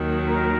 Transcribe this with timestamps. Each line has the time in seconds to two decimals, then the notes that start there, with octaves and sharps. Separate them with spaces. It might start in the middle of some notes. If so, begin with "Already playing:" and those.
Already playing: D#2 D#3 F#3
0.26 A#4